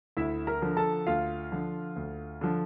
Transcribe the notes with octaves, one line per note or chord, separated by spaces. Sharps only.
D2 E4 E5
A#4 A#5
D3 F3
A4 A5
D2 F4 F5
D3 F3
D2
D3 F3